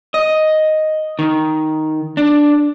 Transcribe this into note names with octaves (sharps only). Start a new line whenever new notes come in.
D#5
D#3
D4